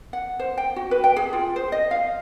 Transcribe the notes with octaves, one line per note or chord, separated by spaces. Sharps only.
F#5
C5
G5
F#4
B4
G5
G#4
F4
C5
D#5
F5